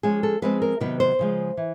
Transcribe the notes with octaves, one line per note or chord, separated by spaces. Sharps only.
F3 G#3 C#4 G#4
A4
F3 G#3 C4 B4
A#4
C3 D#3 F#3 B3 B4
C5
C#3 F3 G#3
E3